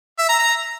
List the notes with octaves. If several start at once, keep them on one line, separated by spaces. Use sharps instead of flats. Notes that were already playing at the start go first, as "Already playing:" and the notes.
E5
A#5
A#5